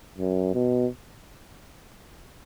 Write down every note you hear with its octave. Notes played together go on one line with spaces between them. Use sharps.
F#2
B2